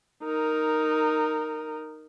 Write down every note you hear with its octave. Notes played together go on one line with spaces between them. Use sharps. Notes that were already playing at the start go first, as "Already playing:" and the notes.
D#4 A#4